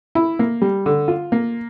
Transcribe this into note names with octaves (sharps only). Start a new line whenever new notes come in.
E4
A#3
G3
D3
F4
A#3